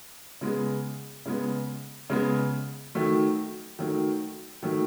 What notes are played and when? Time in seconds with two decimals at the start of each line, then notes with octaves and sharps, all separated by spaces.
0.41 C#3 G#3 B3
1.26 C#3 G#3 B3
2.10 C#3 G#3 B3
2.95 D#3 F#3 A3
3.79 D#3 F#3 A3
4.63 D#3 F#3 A3